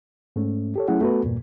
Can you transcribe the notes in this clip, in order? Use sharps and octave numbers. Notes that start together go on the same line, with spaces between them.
G#2 A3 C#4
G4 A4 C#5
F#3 A3 C#4 E4 G#4 F#5
A3 B3 F#4 A4 B4
E2 G2 A#2